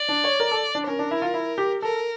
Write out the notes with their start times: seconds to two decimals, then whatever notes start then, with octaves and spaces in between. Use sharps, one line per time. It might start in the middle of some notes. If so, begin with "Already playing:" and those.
Already playing: D5
0.09 D4
0.24 C#5
0.40 A#4
0.51 A4
0.75 D4
0.87 C#4 A#4
0.99 D4
1.11 E4
1.22 F4
1.34 E4
1.58 G4
1.82 A4 A#4